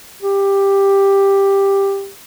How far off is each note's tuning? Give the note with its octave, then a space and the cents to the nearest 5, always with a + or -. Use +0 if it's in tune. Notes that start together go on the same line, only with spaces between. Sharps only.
G4 +10